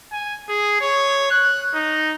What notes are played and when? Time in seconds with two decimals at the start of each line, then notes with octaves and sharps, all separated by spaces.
0.12 G#5
0.49 G#4
0.81 C#5
1.31 F#6
1.74 D#4